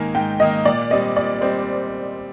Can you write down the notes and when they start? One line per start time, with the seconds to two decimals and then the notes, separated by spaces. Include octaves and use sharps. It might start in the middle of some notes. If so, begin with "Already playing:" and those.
Already playing: G#2 D#3 A#3 G#5
0.15 G#2 G5
0.40 D#3 A#3 D#5
0.65 A#2 D5
0.91 G3 C4 D#5
1.16 A#2 D5
1.41 G3 C4 C5